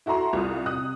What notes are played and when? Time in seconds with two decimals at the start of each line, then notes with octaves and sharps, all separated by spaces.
0.06 E4 F#4 A4 A#5 C6
0.33 C2 F4 D#6
0.66 C3 D#6 F#6